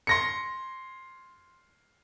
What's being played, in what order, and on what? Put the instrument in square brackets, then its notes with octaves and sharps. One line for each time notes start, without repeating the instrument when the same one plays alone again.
[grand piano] C6 A#6 C#7